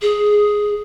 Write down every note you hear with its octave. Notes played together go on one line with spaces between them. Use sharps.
G#4